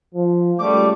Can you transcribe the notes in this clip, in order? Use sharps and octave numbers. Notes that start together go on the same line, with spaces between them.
F3
C#2 G3 A3 D6